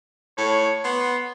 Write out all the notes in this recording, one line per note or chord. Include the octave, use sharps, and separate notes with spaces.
A2 C#5
B3 C6